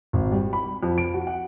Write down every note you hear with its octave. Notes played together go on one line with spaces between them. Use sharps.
G#1
G3
B5
F2
D7
F#4
F#5